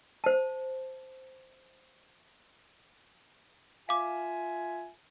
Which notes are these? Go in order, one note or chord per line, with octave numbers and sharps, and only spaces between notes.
C5 A5
F4 E5 F5 G#5 D6